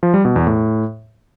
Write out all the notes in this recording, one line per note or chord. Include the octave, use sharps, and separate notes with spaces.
F3
G3
B2
E2
A2